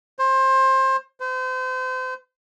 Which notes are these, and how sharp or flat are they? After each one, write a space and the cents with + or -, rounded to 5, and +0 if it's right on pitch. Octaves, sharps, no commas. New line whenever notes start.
C5 +25
C5 -35